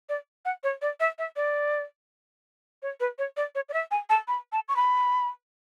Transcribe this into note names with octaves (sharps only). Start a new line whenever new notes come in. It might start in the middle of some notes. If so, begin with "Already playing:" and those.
D5
F#5
C#5
D5
E5
E5
D5
C#5
B4
C#5
D5
C#5
D5
E5
G#5
A5
B5
A5
C#6
B5